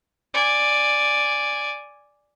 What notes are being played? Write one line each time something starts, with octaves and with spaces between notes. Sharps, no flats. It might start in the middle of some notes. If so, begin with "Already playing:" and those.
D5 G#5